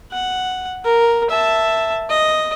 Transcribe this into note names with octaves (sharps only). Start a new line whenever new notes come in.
F#5
A#4
E5 A5
D#5